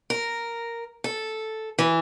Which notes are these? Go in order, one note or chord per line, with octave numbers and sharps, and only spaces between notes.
A#4
A4
E3